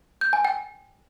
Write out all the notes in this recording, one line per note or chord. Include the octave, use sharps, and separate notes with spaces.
G6
G#5
G5